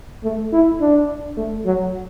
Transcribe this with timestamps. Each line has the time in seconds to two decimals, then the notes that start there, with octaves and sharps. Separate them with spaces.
0.24 A3
0.52 E4
0.81 D4
1.37 A3
1.66 F#3